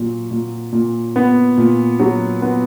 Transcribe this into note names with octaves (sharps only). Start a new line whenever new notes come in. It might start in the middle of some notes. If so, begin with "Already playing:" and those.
Already playing: A#2 F#3
A#2
A#2
B3
A#2
F#3
B3